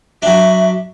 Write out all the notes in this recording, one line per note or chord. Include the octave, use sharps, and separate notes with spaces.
F#3 D4 E5